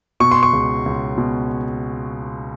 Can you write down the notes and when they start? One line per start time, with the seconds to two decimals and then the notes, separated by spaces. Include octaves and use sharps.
0.20 B2 C#6
0.32 C6
0.43 C#6
0.53 C#2
0.86 C#2
1.17 B2